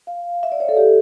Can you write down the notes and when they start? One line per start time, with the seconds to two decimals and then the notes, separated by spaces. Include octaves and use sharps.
0.07 F5
0.43 E5
0.52 D5
0.60 C#5
0.69 A4
0.77 G4